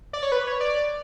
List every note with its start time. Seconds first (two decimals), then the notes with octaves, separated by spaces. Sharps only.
0.13 D5
0.23 C#5
0.32 B4
0.47 C#5
0.61 D5